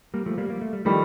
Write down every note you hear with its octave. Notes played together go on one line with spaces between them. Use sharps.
G3 A#3
F3 A3
G3 A#3
A#3
A3
G3
D#3 F3 G3 A3